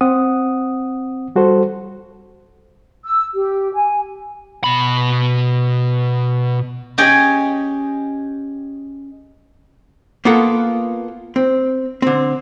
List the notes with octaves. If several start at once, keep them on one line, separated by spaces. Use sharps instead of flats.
C4 F#5 D#6
G3 F#4 A4 C5
E6
G4
G#5
B2 B5
C#4 G4 G#4 D#5 G5 G#5
A#3 B3 F4 A4 F#5
C4
D3 C4